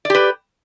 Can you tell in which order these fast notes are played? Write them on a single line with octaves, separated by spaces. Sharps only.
D5 G4 B4